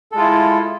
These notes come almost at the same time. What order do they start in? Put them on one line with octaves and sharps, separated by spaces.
A4 G#3 F4 E4